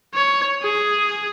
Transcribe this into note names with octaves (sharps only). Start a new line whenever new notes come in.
C#5
G#4